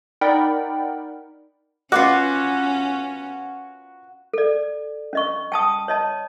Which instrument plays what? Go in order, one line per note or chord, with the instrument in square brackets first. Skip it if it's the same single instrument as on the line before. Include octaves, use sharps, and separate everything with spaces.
[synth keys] D#4 A#4 D5 F#5 G5 B5
[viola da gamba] C#4 [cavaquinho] F4 C#5 D6 [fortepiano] F#4 B4 [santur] F#5
[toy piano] A4 D5
C#4 D#5 C#6
G5 A5 D#6
C#5 D#5 A5